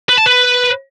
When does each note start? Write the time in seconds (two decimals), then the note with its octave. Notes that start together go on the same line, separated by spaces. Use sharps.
0.09 B4
0.17 A5
0.26 B4